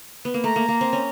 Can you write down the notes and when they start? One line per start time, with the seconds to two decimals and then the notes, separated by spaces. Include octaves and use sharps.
0.25 B3
0.34 A#3
0.44 A3 A#5
0.56 A#3
0.68 A#3
0.81 C4
0.93 C#4